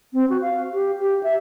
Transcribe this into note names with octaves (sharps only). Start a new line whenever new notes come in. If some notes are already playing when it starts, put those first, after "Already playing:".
C4
F#4
F5
G4
G4
E5